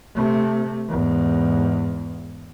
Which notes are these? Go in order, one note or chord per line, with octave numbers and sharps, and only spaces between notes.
C3 A3
E2 G#2